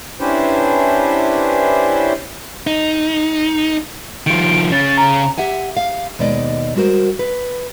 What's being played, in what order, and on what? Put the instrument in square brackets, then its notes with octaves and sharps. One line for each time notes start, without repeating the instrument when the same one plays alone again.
[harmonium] C#4 D4 E4 G4 B4 C5
[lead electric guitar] D#4
[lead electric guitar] D#3 F3 [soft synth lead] D7
[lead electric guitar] C#3 C#4 [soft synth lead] A6
[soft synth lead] A#5
[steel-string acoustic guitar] G4 E5 F#5 G#5
F5
D#2 B2 G#3 D5 D#5
G3 G#3 F#4 A#4 C5
B4